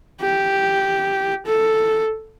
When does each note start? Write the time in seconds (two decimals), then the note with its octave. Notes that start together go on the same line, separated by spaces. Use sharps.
0.21 G4
1.46 A4